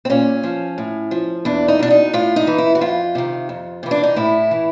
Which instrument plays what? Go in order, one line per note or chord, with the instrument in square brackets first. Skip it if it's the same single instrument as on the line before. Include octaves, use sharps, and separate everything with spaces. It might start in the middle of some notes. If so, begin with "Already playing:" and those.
[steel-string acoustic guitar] C4
A#2 C#4
F3
A2
F3
E2 D4
D#4
B2 D4
D#4
A2 F4
D#4
E3
E4
F#4
F2 F4
C3 D#3
F2
C3 E3
D4
D#4
A2 E4
E3